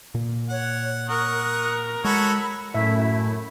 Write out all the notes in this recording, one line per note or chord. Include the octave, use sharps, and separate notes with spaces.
A#2 A#3
C#5 F#5
A#4 F#5 C#6 D#6 F#6
G#3 F#4 A4 C#5 B5 E6
F#2 A2 A3 E4 E5